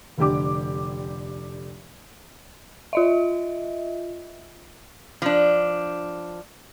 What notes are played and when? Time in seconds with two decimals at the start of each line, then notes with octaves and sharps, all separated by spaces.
0.18 F1 D3 G4 D6
2.93 F4 D#5 E5
5.22 F3 D4